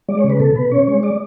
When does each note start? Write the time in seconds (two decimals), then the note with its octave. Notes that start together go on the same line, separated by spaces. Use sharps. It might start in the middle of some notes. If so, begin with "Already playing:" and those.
0.09 G#3 D5
0.19 C#5
0.24 C#3
0.30 B4
0.40 B2 A4
0.55 B2 B4
0.71 C#4 C#5
0.88 G#3
1.03 D5